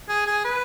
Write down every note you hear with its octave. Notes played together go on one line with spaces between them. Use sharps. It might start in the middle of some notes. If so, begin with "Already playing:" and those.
G#4
G#4
B4